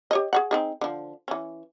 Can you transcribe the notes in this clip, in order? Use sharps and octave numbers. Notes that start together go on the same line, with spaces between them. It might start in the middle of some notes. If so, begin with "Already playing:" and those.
G4 C#5 D#5
G#4 C#5 F#5
C4 D#4 G#4
D3 F3
E3 C#4